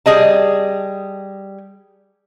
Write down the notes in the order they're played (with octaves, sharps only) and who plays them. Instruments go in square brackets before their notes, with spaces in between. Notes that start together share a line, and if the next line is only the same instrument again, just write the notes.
[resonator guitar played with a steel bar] G3 G#4 D#5 A5